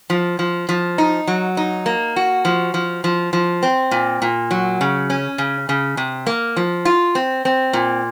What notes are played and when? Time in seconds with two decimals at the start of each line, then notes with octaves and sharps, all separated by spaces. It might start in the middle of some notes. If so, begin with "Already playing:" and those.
0.10 F3
0.39 F3
0.69 F3
0.98 D#4
1.27 F#3
1.57 D#4
1.86 A#3
2.16 F#4
2.45 F3
2.74 F3
3.04 F3
3.33 F3
3.63 C4
3.91 A#2
4.22 A#2
4.51 F#3
4.81 C#3
5.10 C#4
5.38 C#3
5.69 C#3
5.97 C3
6.27 A#3
6.56 F3
6.85 F4
7.15 C4
7.45 C4
7.73 A#2